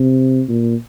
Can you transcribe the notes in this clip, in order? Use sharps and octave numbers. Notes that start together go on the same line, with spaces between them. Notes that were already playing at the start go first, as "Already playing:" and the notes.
Already playing: C3
A#2